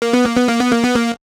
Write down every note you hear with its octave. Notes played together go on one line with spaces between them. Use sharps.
A#3
B3
A#3
B3
A#3
B3
A#3
B3
A#3